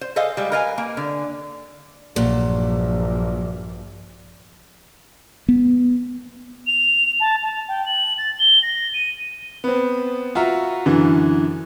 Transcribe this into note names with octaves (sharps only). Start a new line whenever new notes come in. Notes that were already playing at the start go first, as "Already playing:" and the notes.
C5
G#4 A4 C5 D#5 F5
G3 G#3
A#4 B4 D#5 F5 G#5
A#3
D3
A#1 G2 A#2 F#3
B3
F7
A5
A5
G5
F#7
A6
G7
A#6
D#7
B3 C4
F4 F#4 E5 A#5
F#2 D3 E3